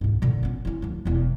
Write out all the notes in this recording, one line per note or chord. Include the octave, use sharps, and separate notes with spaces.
D2 G#2
A#2 D3
B3 C#4
C#4 E4
D2 F3
E1 E2